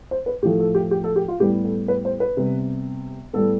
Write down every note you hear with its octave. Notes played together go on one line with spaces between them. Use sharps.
C5
B4
A2 F3 A3 G4
A4
G4
G4
A4
G4
F4
A2 G3 B3 G4
A4
B4
C5
B4
C3 G3 B3
A2 G3 B3 A4